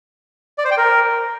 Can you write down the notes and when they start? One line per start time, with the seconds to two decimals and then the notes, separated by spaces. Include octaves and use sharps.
0.58 D5
0.65 C5
0.71 G5
0.77 A#4